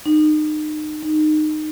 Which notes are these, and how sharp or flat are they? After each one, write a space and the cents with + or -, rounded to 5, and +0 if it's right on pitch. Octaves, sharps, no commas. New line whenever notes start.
D#4 -30
D#4 -20